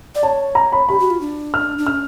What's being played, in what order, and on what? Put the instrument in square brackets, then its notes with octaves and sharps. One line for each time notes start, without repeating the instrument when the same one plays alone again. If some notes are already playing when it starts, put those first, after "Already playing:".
[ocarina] D5
[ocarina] C#5 [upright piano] A5
[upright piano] A#5
B5
[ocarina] G4 [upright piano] B5
[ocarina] F#4
F4
D4
[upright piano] F6
[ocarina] D4
[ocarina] C#4 [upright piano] F6